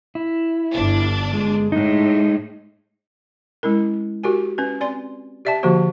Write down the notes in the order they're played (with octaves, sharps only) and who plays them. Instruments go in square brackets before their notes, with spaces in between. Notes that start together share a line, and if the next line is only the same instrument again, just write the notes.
[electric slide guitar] E4
[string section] G1 D4
[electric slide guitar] G#3
[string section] A2 [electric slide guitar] G#3 D#4
[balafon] G#3 C#4 E4 A#4
F#4 G4 A#4 G#5
C#4 B4
C4 D5 G#5 C6
G4 D5 E5 G5 A5
D3 F3 A#3 F#4 G4 C5